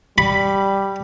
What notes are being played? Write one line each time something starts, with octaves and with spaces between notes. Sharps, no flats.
G3 B5